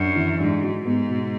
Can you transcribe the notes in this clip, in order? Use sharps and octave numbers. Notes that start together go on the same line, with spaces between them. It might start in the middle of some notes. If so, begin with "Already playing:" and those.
Already playing: F#2 D4
E3
G#2 D4
F#3
G#2 B3
B2